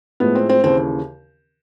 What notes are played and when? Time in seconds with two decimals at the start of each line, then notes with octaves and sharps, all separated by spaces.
0.20 A2 F3 G#3 B3
0.35 C4
0.49 C4
0.64 D#2 C#3 E3 C4